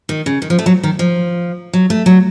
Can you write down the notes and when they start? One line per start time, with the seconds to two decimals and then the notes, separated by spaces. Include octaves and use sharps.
0.09 D#3
0.26 C#3
0.42 D#3
0.50 F3
0.59 A3
0.66 F#3
0.83 D#3
0.99 F3
1.73 F#3
1.90 A3
2.06 F#3